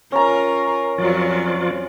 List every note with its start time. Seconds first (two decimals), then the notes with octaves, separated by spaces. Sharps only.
0.12 C#4 F4 A#4 A#5
0.98 F2 F3 F#3 F4 F#4 D5